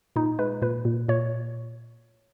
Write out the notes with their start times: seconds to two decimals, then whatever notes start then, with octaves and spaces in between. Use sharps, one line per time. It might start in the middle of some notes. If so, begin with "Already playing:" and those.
0.16 A#2 D#4
0.39 G#3 B4
0.62 A#2 B4
0.85 A#2
1.09 A#2 C#5